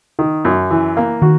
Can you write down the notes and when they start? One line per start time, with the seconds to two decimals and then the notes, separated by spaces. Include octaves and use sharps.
0.19 D#3
0.45 F#2
0.71 E3
0.97 A#3
1.22 D#3 F#4